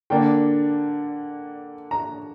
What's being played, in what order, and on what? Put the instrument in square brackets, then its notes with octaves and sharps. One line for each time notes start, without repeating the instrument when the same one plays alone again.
[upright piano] D3 A#3 D4 G5
A#5